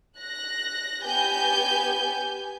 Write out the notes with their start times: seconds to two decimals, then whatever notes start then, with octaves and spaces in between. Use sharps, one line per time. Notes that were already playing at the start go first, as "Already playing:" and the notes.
0.16 F#6 A#6
1.02 B3 G4 G#5 G6